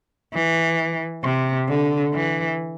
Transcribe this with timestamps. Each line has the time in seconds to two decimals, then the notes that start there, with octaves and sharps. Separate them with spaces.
0.34 E3
1.23 C3
1.68 D3
2.14 E3